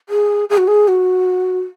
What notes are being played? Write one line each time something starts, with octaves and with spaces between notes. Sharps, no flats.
G#4
G#4
F#4
G#4
F#4